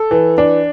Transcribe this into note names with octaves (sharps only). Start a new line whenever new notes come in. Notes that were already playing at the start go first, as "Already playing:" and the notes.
Already playing: A4
E3
D4